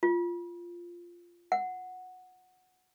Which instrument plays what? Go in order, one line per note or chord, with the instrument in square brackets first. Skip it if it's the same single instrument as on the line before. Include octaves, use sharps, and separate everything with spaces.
[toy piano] F4
F#5